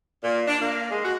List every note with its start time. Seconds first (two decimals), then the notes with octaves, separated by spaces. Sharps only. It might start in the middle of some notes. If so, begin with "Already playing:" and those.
0.24 A#2
0.48 D4
0.61 A#3
0.90 G#3
1.04 F#4